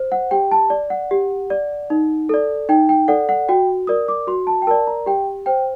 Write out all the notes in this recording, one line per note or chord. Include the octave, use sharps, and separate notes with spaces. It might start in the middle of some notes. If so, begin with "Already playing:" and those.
Already playing: C5
F#5
G4 G5
A5
D5
F#5
G4
D5
D#4
A4 D5
D#4 G5
G5
A4 D5 F#5
F#5
F#4 G5
A#4 D5 D#6
D6
F#4 C6
A5
G5
A#4 D5 A5
A#5
G4 G5
C5 G5